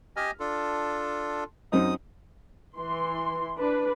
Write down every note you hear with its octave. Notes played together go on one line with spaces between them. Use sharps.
G4 D#5 G#5 F6
D4 F4 A4
F#2 C4 D#4 D#6
E3 C6
D4 B4